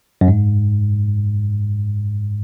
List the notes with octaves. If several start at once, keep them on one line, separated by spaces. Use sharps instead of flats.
F#2
G#2